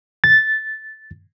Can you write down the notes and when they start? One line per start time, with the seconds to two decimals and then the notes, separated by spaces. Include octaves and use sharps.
0.24 A6